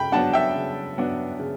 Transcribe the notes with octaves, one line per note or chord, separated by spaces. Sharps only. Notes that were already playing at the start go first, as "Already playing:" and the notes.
Already playing: C#3 G5 B5
F#3 B3 D4 F#5 A5
E5 G5
C#3
F#3 B3 D4
C#3